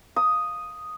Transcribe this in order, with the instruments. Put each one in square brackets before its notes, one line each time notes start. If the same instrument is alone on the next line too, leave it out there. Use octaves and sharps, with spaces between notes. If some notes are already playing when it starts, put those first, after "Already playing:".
[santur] D#6